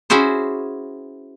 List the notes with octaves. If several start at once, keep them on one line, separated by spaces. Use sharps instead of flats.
C#4 E4 F#4 G#4 C5